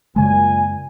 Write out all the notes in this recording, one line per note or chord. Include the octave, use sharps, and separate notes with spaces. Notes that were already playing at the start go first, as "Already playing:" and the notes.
F#2 A#2 C#3 G#3 G#5